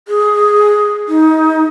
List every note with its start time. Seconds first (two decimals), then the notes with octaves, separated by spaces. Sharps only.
0.08 G#4
1.09 D#4